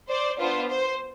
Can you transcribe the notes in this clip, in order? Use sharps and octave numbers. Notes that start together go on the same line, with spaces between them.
C5 D5
B3 D4 F4 C5
C5